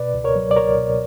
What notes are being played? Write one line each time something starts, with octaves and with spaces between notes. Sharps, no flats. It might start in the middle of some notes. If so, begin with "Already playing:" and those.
Already playing: B2 B4 D5
C#2
A#4 C#5
F#3
D5
C#2 A#4 C#5
B2